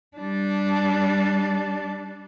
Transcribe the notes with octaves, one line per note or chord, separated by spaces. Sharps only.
G3 D4